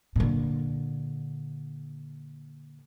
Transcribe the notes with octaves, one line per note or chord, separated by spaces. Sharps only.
A#2 D3